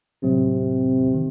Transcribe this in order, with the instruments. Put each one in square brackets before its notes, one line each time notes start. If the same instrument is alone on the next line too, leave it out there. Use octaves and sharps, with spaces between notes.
[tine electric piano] A2 F#3 C4 [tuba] C3
[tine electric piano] D#3